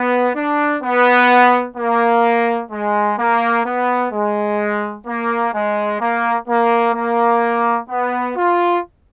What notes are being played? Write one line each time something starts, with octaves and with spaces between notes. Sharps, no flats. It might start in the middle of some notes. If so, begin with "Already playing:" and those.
Already playing: B3
D4
B3
A#3
G#3
A#3
B3
G#3
A#3
G#3
A#3
A#3
A#3
B3
F4